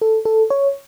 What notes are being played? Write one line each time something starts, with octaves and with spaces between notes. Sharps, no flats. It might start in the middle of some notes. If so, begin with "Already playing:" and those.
A4
A4
C#5